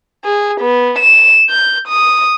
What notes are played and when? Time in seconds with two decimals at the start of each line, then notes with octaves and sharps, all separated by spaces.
0.24 G#4
0.61 B3
0.99 E7
1.50 G6
1.88 D#6